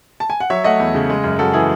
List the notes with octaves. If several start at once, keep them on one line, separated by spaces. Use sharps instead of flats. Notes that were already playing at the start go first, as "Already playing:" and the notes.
A5
G#5
F#5
F#3 C#5 E5
A3 D#5 F#5
E2
C#3
G#3
F#2
F#2 F#4 A4
E3 E4 G#4